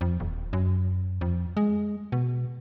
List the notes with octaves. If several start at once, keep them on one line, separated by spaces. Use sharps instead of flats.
F2
D#1
F#2
F2
G#3
B2